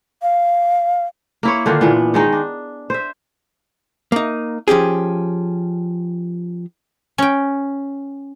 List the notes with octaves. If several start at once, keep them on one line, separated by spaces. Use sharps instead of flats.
F5
A#3 E4 C#5
D3 D#3 D4 F4
A#2 E3 B3
D#3 G#3 D#4
D4
C5 E5
A#3 D#4
F3 C#4 G4 G#4
C#4 G5